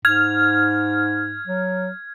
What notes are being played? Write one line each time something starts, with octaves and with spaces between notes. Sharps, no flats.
G#2 F6 G#6
F#3